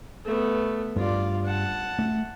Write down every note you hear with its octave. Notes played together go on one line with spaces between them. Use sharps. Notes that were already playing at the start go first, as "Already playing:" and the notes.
A3 B3
G2 F4 D5
F#5 A5
A3